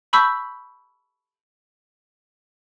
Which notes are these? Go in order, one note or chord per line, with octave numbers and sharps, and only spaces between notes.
A5 B5 C#6 E6 G6 B6